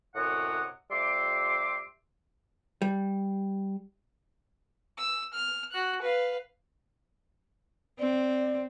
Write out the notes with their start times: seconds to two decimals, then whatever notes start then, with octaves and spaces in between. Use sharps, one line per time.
0.15 F#2 A2 C3 C#5 D#5 F#5
0.91 F2 G3 G4 E5 C6 D6
2.82 G3
4.98 E6
5.33 F6
5.72 F#4 F#6
6.02 B4 F5
7.99 C4 D5